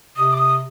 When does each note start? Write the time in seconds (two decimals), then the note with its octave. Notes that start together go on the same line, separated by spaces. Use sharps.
0.16 C3 D#6
0.32 D6
0.38 D#6